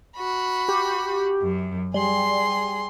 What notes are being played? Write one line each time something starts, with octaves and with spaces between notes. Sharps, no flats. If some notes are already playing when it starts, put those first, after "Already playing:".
F#4 B5
G4
F#2
G3 G#4 C6